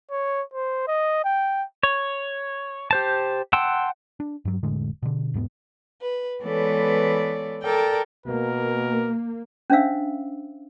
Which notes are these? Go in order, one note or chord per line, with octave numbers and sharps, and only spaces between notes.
C#5
C5
D#5
G5
C#5
G4 C5 A5
F#5 G5 A5 C6 E6
D4
G2 F#3
F1 A2 D3 G#3
B2 D3
E1 G#2 F3 B3
B4
E3 G#3 B3 A4 C#5 D5
A4 A#4 D5 G5
B2 A#3 A#4
C#4 D4 C5 E5 F5 E6